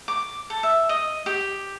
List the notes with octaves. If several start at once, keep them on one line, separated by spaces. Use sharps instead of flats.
D6
A4
E5
D#5
G4